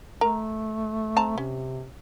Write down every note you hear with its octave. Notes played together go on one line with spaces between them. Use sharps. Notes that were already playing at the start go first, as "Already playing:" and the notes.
A3 A#4 A#5
C4 A5 A#5
C3 C#4